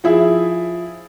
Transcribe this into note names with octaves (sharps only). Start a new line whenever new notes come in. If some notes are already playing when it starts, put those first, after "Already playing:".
F3 E4 G#4 E5